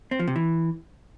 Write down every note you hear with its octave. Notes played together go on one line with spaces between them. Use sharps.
C4
F3
C3
E3